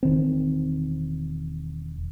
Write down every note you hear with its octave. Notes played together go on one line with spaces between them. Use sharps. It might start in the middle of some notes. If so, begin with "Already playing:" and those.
E1 D#3 C4